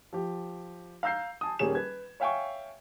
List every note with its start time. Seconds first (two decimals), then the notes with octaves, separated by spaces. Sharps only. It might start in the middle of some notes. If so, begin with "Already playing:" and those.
0.13 F3 G4
1.03 F5 A#5 E6 G6 C7
1.41 G#5 A5 D#6
1.59 D#1 G3 A#3 C#4 G#4 E7
1.75 B4 G#6
2.20 C#5 E5 F5 G5 G#5 C#6